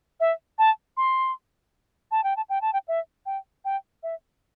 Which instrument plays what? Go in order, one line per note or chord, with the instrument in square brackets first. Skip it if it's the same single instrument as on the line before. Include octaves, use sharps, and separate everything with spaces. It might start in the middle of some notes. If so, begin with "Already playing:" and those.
[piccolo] E5
A5
C6
A5
G5
A5
G5
A5
G5
E5
G5
G5
E5